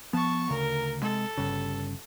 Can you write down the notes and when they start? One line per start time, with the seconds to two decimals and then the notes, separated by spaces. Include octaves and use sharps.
0.13 F3 B3 A5 C#6
0.50 D2 C#3 A#4
1.02 C3 G#3 A4
1.37 G1 G2 C#3